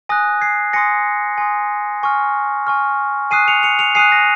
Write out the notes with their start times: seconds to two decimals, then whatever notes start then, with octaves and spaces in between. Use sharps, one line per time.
0.09 G#5 D#6 F#6 A#6
0.41 G#6 C7
0.73 G#5 C6 D#6 A#6 C#7
1.38 G#5 C6 D#6
2.03 G#5 C#6 F6
2.67 G#5 C#6 F6
3.31 G#5 D#6 F#6 C7 D#7
3.48 C#7 F7
3.63 C#7 F7
3.79 C#7 F7
3.95 G#5 D#6 F#6 C7 D#7
4.12 A#6